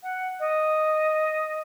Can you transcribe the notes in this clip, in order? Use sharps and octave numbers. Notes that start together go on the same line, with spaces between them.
F#5
D#5